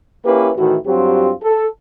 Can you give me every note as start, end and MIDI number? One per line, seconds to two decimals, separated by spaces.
0.25 0.51 58
0.25 0.51 61
0.25 0.51 64
0.25 0.51 67
0.25 0.51 71
0.57 0.76 45
0.57 0.76 51
0.57 0.76 52
0.57 0.76 64
0.57 0.76 66
0.87 1.32 43
0.87 1.32 54
0.87 1.32 60
0.87 1.32 65
0.87 1.32 67
1.42 1.66 69